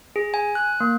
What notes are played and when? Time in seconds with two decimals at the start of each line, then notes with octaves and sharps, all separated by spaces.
0.16 G#4
0.34 G#5
0.55 F#6
0.80 A#3